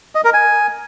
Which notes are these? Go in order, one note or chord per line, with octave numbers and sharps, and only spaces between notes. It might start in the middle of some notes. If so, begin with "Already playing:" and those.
D#5
A#4
G#5